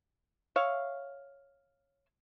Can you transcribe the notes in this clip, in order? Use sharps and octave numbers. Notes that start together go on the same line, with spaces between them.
C#5 E5 F5